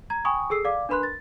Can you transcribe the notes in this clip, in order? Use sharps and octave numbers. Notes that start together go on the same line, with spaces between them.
A#5 G#6
G5 G#5 B5 C#6 D#6
G#4 A4 E6 C7
D5 F5 D6
D4 A#4 B4 B5 C6 F#6
A6